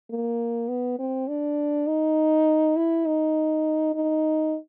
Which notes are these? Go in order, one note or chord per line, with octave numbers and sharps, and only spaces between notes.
A#3
B3
C4
D4
D#4
E4
D#4
D#4